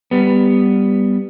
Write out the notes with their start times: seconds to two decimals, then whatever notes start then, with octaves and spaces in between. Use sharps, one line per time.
0.11 G3 B3